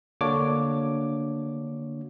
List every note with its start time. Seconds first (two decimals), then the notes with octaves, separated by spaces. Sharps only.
0.21 D3 A#3 D4 F#4 C#5 D6